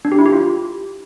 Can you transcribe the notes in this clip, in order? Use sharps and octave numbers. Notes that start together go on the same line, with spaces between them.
D4
G4
E4
G4
F4